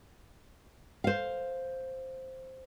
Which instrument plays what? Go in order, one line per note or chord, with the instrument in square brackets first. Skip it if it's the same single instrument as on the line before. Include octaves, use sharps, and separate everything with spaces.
[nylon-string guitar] C5 F5